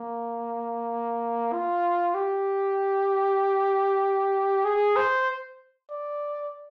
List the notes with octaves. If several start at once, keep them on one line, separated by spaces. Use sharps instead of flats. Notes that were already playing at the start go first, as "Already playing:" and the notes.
Already playing: A#3
F4
G4
G#4
C5
D5